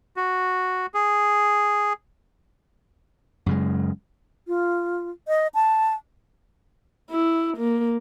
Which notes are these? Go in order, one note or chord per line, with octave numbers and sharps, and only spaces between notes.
F#4
G#4
F#2 C#3 G#3
F4
D#5
A5
E4
A#3